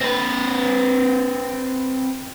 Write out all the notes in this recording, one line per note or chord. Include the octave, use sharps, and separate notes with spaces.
C4 B4